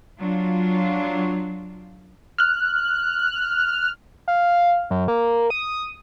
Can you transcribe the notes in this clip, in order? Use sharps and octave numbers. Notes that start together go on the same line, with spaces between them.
F#3 D4 F4
F6 F#6
F5
F#2
A#3
D#6